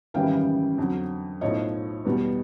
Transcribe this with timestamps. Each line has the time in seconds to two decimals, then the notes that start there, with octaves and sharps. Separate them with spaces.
0.14 G#1 F#2 C#3 E3 G3 F5 G5
0.78 F2 D3 F#3
1.41 B1 A2 F3 C#5 D#5
2.05 E2 B2 G3